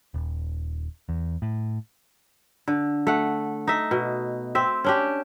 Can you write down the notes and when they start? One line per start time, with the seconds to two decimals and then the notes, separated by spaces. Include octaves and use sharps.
0.14 D#1
1.09 E2
1.42 A2
2.68 D3
3.07 A3 F#5
3.67 D#4 E5
3.91 B2
4.55 C4 E5
4.84 C#4 D4 G4